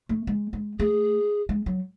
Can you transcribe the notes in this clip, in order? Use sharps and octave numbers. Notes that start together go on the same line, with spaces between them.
A3
G#3
G#3
A3 G#4
G#3
F#3